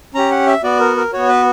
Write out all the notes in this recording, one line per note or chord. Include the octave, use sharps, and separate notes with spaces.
C#4 G4 A#5
F#5
E5
B3 F#4 D5
A#4
A#4
B3 F#4 C#5
B4